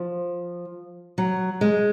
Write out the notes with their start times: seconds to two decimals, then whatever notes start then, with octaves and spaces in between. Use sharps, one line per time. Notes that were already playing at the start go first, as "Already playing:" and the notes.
Already playing: F3
1.18 F#3
1.61 G#3